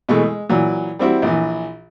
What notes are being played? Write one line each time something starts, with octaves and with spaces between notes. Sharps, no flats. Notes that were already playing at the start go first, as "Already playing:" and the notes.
B2 E3 G#3 A3
G#3
A#2 E3 F#3
G3 C4 E4 F#4
A#1 E3